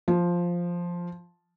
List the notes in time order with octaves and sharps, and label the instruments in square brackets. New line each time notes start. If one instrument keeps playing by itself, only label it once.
[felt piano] F3